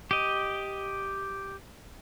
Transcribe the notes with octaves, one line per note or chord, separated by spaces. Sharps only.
G4 D#5